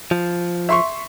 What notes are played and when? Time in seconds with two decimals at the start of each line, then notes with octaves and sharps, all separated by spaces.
0.11 F3
0.69 E5 C6 C#6